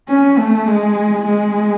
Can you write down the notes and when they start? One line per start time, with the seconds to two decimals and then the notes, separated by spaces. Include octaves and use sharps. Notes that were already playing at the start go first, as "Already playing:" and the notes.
0.09 C#4
0.38 A3
0.67 G#3
1.26 G#3